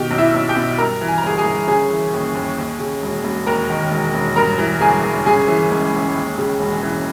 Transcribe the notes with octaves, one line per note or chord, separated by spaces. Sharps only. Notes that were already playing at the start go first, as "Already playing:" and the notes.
Already playing: B2 D#3 G4 G5
B1
E4 E5
B1
G4 G5
B2
G2 A#4 A#5
E3
G#5
A#5
G1 G#4 G#5
G#4 G#5
G1
C#3 G#4 G#5
E3
D#2
D#2
D#2
C#3
E1
E1
D#2 A#4 A#5
D#3
E1
E1
G2 A#4 A#5
E3
G1 G#4 G#5
G1
C#3 G#4 G#5
E3
C#2
C#2
D#2
C#3
E1
E3